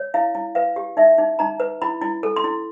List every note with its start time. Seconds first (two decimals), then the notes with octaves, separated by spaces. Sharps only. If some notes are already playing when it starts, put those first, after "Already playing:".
Already playing: C#5
0.14 E4 F5
0.35 E4
0.55 B4 F5
0.76 G4
0.97 D#4 E5
1.18 D#4
1.39 D#4 A#5
1.60 B4
1.82 E4 B5
2.02 E4
2.23 A4
2.36 C6
2.44 E4